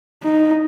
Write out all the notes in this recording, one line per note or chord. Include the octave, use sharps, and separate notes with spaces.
D#4